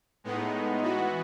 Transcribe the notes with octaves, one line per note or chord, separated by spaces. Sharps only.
A2 G#3 B3 D#4
E3 B3 F#4